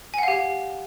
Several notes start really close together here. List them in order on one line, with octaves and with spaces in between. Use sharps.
G#5 F#5 F5 G4